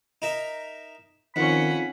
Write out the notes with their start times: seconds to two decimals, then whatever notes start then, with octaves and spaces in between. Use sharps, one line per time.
0.22 D#4 A#4 E5
1.36 F2 D#3 C#4 F#5 B5